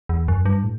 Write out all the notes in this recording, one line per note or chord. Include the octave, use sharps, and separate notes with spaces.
E2
F#2
G2
A2